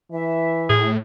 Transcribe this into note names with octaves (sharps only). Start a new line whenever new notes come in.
E3 E5
A2 G#4